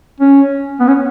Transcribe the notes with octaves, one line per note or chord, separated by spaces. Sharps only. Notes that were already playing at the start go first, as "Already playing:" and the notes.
C#4
B3
C#4